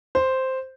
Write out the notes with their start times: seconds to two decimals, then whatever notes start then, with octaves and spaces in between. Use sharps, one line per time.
0.15 C5